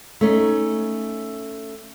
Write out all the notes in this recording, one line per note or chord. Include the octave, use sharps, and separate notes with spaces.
A3 C#4 D#4